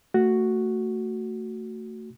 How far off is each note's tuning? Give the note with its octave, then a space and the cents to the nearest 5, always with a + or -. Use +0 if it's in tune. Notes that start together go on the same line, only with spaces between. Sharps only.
A3 +25 F#4 +0